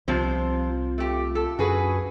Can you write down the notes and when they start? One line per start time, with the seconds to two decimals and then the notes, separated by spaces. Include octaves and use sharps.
0.08 C2 C3 F3 C4 F4 C5
0.98 A3 G4
1.35 A4
1.59 F#2 F#4 G#4 B4 G#5